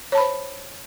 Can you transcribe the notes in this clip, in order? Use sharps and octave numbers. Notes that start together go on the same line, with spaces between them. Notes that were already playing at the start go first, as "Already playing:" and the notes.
C5 C#5 A5 B5